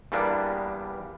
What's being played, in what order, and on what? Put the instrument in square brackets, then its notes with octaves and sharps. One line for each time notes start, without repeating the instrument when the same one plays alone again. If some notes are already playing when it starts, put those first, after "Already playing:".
[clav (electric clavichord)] E2 G2 G3 A#3 B3 D4